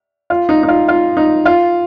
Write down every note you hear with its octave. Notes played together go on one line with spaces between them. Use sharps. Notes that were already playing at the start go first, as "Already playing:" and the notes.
F4
D#4
D#4
F4
F4
D#4
F4